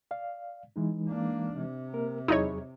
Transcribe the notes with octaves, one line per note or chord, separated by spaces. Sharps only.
D5 F5
E3 G#3 D#4
A#3 D4
C3
A#3 A#4
E2 F#3 D#4 E4 G#4 C#5